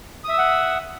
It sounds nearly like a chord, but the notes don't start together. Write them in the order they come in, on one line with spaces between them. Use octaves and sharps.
D#6 E5 E6 F#5